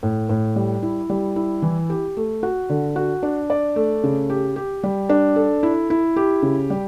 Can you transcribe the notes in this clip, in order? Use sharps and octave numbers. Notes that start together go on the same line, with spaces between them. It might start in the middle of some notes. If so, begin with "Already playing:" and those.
A2
A2
G3
E4
G3
E4
E3
G4
A3
F#4
D3
F#4
D4
D5
A3
C#3
G4
G4
G3
D4
A4
E4
E4
G4
C#3
G3